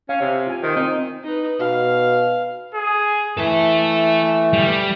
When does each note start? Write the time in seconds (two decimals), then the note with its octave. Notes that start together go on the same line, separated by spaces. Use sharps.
0.09 C#4 F5
0.21 C3 F5
0.47 F4 G#5
0.63 D#3 C5
0.76 C4 D#4
1.23 D#4 B4
1.60 B2 F5
2.75 G#4
3.37 E3 A3 A4 E5
4.53 G3